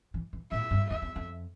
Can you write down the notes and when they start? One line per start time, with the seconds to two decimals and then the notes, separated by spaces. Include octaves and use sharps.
0.14 E3
0.33 E3
0.51 A2 E5
0.71 G2
0.90 E2 E5
1.02 E2
1.16 F2